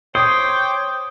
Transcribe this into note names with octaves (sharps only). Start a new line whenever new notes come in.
C5 C#5 G5 D6 D#6